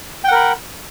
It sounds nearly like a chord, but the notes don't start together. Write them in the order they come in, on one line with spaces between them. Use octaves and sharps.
G5 F#5 A#4 B5